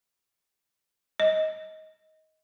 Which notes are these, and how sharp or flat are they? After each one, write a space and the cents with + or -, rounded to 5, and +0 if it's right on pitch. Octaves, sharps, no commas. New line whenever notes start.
D#5 +15